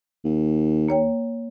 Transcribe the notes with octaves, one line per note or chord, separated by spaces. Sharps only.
D#2
A#3 C#5 G5